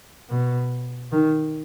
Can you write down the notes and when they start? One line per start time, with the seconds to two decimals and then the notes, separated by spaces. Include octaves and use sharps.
0.30 B2
1.12 D#3